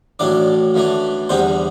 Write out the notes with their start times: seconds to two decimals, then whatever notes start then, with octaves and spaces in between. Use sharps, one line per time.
0.19 A1 A2 F#3 D4 D5
0.74 F#2 E3 A3 D4
1.29 E2 D3 G3 B3 C4 C5